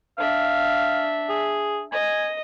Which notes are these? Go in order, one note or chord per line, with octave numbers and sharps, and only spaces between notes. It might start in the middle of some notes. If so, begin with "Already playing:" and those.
D4 E5 F5
G#4
D#5 G#5